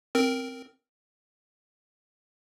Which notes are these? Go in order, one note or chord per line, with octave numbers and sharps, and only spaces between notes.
C4 A#4